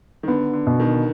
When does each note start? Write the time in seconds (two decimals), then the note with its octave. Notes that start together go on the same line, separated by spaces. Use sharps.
0.23 D#3
0.28 D3 B3
0.53 D3
0.67 B2
0.80 D#3